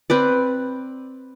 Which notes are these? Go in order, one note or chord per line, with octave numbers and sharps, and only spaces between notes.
C4 B4 D5